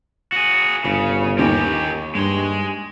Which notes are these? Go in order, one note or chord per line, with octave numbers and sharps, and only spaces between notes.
F#4 G#4
G1 C#3 C#7
D#2 G4 A#4 G#5
G2 G#3 C6